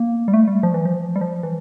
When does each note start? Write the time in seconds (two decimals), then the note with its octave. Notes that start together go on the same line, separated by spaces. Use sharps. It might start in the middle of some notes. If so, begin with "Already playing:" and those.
Already playing: A#3
0.28 G3
0.34 A3
0.48 G3
0.63 F3
0.74 E3
0.85 F3
1.16 G3
1.21 F3
1.43 E3